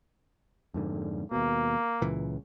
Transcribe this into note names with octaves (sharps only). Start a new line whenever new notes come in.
F2 G#2 D3
D#2 B2 A#3
C#2 A#2 E3